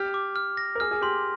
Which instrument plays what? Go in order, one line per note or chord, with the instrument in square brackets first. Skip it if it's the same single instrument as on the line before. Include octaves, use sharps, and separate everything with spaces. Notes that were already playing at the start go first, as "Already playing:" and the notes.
Already playing: [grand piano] G4 [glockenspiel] F6
[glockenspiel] D6
F6
A#6
[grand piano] A#4
[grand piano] G#4 [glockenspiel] F6
[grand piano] G#4
[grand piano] G4 [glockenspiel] C6